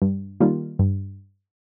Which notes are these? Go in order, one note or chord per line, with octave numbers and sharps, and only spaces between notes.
G2
D#3 G3 A#3 F4
G2